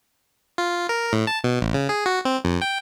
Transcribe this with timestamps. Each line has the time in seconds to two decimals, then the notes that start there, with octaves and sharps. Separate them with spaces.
0.58 F4
0.89 A#4
1.13 A2
1.27 A5
1.44 B2
1.61 A1
1.74 C#3
1.89 G#4
2.06 F#4
2.25 C4
2.45 F2
2.62 G5